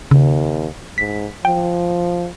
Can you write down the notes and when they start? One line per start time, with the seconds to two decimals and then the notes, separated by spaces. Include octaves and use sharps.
0.11 D#2 C#3
0.98 G#2 B6
1.45 F3 G5